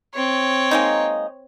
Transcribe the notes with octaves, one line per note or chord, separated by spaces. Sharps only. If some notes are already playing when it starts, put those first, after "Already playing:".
C4 C#5
G#3 A#3 D#4